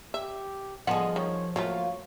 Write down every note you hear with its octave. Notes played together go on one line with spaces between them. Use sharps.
G4 E5
D3 F3 B3 G#4 D#5 F#5
D#3 C#5
F#3 A3 A#3 F4 C#5